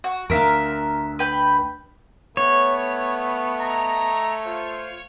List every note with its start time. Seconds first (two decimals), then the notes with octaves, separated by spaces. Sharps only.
0.04 F#4
0.30 D2 A#4 E5 F5
1.19 B4 G5 B5
2.37 A3 B3 C#5
3.57 D#5 A#5
4.45 F4 C5